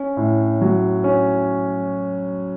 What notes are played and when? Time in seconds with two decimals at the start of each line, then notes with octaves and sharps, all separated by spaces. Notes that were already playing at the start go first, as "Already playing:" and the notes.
Already playing: C#4
0.17 A2
0.61 F#3
1.04 C#4